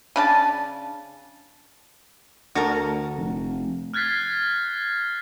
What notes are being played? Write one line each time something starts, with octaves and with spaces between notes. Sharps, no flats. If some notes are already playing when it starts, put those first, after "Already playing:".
C#3 D4 A5
D2 F#4 A4 A#4
F1
F6 F#6 G#6 A6 B6 C7